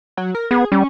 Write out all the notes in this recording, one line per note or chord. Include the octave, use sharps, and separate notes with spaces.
F#3
A#4
B3 G#4
G3 C#4